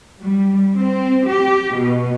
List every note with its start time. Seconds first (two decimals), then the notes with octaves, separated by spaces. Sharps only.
0.20 G3
0.77 C4
1.29 G4
1.76 B2